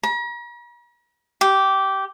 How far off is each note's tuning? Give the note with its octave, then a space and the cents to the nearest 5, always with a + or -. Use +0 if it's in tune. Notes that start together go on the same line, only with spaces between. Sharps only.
A#5 +45
G4 -15